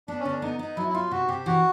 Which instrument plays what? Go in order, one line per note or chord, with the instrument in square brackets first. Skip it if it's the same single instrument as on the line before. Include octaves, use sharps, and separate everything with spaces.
[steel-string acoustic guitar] B3 [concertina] D4
[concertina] C#4
[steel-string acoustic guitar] D3
[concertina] D4
[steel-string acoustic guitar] B3 [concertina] D#4
[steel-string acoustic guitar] B3 [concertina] D#4
[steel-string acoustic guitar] F#3 [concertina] E4
[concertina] E4
[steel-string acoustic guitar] D#4 [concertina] F4
[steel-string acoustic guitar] C3 [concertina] F#4
[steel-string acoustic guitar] C3 [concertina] G4
[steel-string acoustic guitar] E3 [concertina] F#4